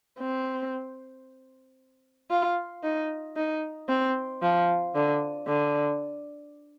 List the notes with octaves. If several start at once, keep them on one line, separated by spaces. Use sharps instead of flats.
C4
F4
D#4
D#4
C4
F3
D3
D3